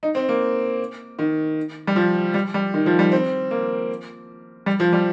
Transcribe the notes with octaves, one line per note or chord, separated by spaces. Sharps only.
D#4
C4
A#3
D#3
G3
F3
G3
G3
D#3
F3
G3
C4
A#3
G3
F3
G3